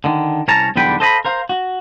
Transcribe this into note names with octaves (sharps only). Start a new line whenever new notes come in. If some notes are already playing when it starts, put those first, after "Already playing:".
D3 D#3
C2 C#4 A#4 C#5 A5 A#5
B1 E2 D3 G3 B4 G5
A4 C5 D#5 F5 G#5 B5
A#4 C5 F5
F#4